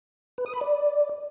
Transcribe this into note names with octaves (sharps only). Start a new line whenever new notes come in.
B4
D#6
B5
D5